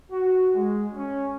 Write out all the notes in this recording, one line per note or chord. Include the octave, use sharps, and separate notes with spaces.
F#4
G#3
C#4